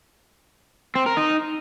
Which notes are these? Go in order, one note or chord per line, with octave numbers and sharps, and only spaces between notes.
C4
A#4
D#4